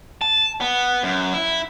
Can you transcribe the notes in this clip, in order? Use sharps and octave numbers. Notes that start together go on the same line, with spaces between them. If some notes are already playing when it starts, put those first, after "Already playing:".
A5
B3
F#2
E4